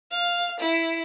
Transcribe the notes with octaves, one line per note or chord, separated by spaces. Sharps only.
F5
E4